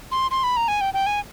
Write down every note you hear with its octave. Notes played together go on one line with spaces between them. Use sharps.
C6
C6
B5
A#5
G#5
G5
G5
G#5